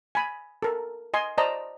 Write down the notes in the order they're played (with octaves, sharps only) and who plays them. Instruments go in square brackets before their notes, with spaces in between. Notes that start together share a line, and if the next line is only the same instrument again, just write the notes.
[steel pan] G#5 B5
A4 A#4
D#5 G#5 C6
C5 D5 D#5 A5 A#5